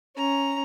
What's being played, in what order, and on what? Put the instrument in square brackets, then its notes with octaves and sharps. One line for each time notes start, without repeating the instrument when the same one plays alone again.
[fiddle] C#4 [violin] A#5